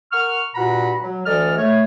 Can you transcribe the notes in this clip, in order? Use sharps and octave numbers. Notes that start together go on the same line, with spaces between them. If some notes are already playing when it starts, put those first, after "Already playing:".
A#4 F#5 C#6 F6
G2 A#2 F#4 F#5 A#5 B5
F#3
D2 E3 A4 D5 D#5 F6
A3 C#5